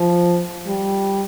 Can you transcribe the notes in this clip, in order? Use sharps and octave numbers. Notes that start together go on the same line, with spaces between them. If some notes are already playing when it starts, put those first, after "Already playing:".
Already playing: F3
G3